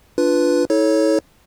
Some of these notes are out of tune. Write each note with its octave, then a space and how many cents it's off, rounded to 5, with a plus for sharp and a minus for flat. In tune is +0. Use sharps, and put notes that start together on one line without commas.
D4 +0 F4 +0 B4 +0
E4 -45 A4 -20 C#5 +0